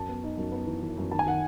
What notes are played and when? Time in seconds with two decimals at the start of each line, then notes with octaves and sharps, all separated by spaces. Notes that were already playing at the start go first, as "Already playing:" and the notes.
Already playing: F#2 A5
0.09 B3
0.24 D#4
0.37 F#2
0.52 B3
0.67 E3
0.83 E3
0.97 F#2
1.11 D#3 A5
1.19 G#5
1.27 D#3 F#5